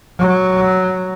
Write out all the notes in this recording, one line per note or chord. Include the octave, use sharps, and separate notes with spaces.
F#3